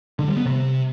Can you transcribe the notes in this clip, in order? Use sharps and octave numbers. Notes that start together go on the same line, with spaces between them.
D3
G3
B3
C3